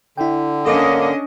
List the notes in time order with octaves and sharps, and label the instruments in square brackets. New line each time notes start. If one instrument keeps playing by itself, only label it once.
[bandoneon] D3 [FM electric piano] E4 G5
[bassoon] A#3 [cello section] C#4 D4 D#5 [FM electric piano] A4 D6